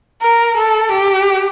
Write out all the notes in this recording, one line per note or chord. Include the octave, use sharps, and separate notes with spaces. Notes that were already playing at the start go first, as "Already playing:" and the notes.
A#4
A4
G4